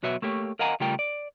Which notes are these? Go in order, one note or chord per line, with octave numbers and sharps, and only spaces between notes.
B1 B2 F#4 B4 C#5 E5
A3 A#3 G4 C#5
A#4 D#5 F5 F#5 G#5 A#5
C#3 G3 A3 F4 A#4 G5
D5